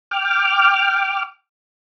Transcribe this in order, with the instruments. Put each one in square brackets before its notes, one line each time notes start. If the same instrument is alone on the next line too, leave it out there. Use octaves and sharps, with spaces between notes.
[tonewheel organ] G5 D6 F6